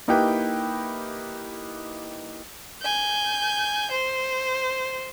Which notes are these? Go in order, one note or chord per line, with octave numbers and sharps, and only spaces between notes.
A#3 D#4 E4 G4 B4 G5
G#5 G6
C5